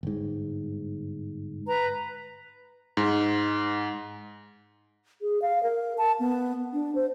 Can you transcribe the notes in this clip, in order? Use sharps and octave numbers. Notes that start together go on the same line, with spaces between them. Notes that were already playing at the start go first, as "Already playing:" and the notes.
G1 G#2
B4 A#5
G#2
G#4
F5
A#4
A5
B3
D4
C5